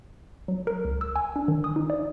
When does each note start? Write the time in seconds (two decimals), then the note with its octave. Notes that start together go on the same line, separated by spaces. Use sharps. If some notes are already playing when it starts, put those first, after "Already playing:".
0.48 F#3
0.67 A#4
0.85 C#2
1.01 E6
1.16 G#5
1.36 D4
1.48 D#3
1.64 D#6
1.76 D#4
1.90 D5